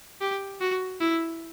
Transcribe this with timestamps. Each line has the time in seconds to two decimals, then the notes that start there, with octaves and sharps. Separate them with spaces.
0.21 G4
0.61 F#4
1.01 E4